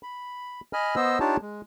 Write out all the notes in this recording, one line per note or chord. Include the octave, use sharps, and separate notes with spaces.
B5
D#5 G#5 B5 F6
B3 C5 D#5 E6
D4 D#4 F4 G4 C#5 A5
G#3